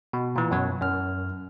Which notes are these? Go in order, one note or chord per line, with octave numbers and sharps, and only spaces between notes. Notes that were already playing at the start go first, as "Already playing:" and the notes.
B2
A#2 E3
F#2 B2 F#3
F#2 F6